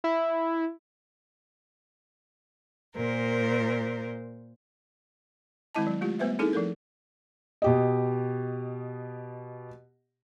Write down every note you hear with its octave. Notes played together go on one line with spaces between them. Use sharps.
E4
A#2 A#4 C5
D#3 G#3 C4 E4 D#5 A5
F#3
G#3 A3 F4 G4
G3 A3 B3 B4 C5 E5
C4 D#4 E4 G#4 A4
F3 A3 A4 A#4
B2 G4 D#5